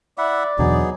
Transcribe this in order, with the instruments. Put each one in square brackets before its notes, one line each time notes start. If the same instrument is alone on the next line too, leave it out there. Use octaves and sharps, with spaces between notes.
[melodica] E4 E5 F#5 [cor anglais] D5
[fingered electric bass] E2 B2 D3 [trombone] F#3 [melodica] B3 D#4 G#4